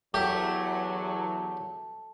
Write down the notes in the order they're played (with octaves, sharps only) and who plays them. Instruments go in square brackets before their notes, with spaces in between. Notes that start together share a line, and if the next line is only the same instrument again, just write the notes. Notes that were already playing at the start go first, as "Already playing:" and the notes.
[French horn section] E2 F#3 [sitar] A3 [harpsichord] G4